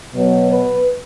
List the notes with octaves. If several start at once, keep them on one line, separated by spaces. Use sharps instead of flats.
B2 F#3 B3
B4